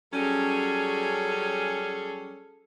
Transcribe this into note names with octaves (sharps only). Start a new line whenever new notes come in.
F#3 G3 C#4 G#4 A4